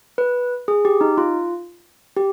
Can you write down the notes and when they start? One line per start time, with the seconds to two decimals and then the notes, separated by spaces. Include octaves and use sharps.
0.18 B4
0.68 G#4
0.85 G4
1.01 D#4
1.18 F4
2.17 G4